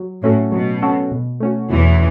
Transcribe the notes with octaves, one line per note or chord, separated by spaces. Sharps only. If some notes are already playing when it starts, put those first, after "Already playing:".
Already playing: F#3
A2 C#4 F#4 A4
B2 F#3
C#4 F#4 A4
B2
A3 C#4 F#4
E2 B2 E3